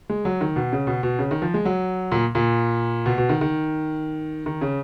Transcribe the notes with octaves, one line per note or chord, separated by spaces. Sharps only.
G#3
F#3
D#3
B2
C#3
B2
B2
C#3
D#3
F3
G#3
F#3
A#2
A#2
B2
B2
D#3
D#3
D#3
C#3